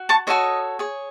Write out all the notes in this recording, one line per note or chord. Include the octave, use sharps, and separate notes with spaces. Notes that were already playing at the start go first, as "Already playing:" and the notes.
Already playing: F#4
A5 C#6
F#4 A4 C#5 D#5
G#4 C#5